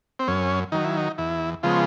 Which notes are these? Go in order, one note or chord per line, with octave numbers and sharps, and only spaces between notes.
C4
F#2 C#4
D#3 F#3 D#4
E4
D#4
E2 E4
C#3 F3 G#3 B3 F4